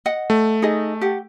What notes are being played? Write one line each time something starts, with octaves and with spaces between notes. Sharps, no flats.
D#5 F#5
A3
D#4 G#4 D#5
G4 F#5